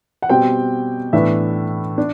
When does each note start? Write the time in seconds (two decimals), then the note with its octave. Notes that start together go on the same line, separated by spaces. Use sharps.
0.22 F#5
0.29 B2 G3 C4 G5
1.13 A2 E3 B3 D4 E5
1.98 D4